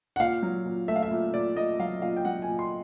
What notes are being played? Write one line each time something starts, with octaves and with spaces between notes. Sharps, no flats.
F#5
A#2 F5
F#3
A#2
A3 E5
F5
E5
A#2
A#2 D5
A#2 D#5
F#3 F5
A#2 F5
G5
F#3 F#5
G#5
A#2
C6